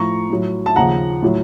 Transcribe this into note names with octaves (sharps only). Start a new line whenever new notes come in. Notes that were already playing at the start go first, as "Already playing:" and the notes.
Already playing: A2 F3 A#5 C#6
A2 F#3
A5
D#2 C#3 F3 F#5 A#5
A2 F#3